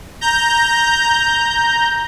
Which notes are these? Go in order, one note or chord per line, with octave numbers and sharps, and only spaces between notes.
A#5 G6